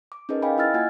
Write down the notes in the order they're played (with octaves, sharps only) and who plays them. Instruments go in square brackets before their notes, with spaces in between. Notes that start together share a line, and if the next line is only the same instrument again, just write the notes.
[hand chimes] D6
C#4 D#4 G#4 A#4 B4 D#5
D#5 F5 G5 G#5 B5
E4 D#5 E6 F6 A6
A#3 F4 F#5 G#5 G#6